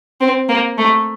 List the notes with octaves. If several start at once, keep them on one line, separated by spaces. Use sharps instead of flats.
C4
A#3
A3